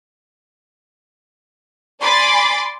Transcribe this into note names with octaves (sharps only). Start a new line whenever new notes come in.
D5 G#5 B5 C6 D6 A6